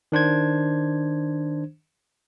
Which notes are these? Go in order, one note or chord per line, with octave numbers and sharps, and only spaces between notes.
D#3 D4 C5 G#6